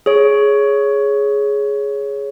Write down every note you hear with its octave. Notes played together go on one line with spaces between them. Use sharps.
G#4 C#5